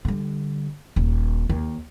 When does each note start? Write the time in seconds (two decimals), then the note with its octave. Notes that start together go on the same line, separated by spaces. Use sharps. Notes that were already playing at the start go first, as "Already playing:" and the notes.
0.05 D3 G3
0.96 D#1
1.49 D#2